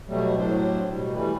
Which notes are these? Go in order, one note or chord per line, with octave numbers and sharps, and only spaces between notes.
B2 F#3 G3 A3
A2 F#3 D4 C5
B2 G3
E3 G3 A3 B4